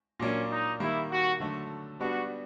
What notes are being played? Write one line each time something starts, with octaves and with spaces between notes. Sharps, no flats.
A#2 F#3 A#3 C#4 D4
D#4
D#3 G3 A#3 E4
F#4
D3 F#3 A3
G3 B3 D4 F#4